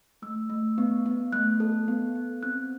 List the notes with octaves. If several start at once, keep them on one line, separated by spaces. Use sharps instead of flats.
A3 E6
A3
B3
B3
A3 F#6
A4
B3
B3
C4 F#6